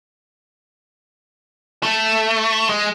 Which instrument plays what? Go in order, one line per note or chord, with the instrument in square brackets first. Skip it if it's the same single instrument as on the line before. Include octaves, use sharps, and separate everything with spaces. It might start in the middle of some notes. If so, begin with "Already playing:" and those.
[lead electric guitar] A3
G#3